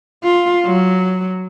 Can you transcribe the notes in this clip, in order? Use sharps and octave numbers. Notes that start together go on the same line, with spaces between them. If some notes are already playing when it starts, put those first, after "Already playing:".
F4
F#3